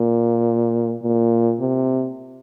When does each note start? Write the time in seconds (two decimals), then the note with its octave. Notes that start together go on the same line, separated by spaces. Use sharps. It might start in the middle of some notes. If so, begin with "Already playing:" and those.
Already playing: A#2
1.03 A#2
1.60 C3